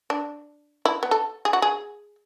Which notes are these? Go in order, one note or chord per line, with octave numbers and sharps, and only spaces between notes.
D4
E4
B3
A4
G#4
F#4
G#4